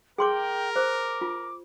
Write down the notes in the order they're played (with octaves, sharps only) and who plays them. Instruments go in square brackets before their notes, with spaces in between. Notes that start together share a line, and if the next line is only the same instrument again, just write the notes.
[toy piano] G#4 C6 D6 [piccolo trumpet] A#4 [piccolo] G5
[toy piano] C5 [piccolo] D6
[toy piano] F4